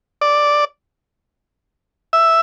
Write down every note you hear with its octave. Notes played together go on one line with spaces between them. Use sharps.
D5
E5